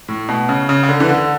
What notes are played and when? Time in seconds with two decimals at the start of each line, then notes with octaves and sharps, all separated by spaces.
0.08 A2
0.29 B2
0.49 C#3
0.69 C#3
0.83 C#3
0.89 D3
1.00 E3
1.09 D3